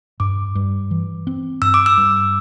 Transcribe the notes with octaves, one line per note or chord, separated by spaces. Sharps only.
G2 D6
G2
E3
C4
G2 E6
D6
E6
G2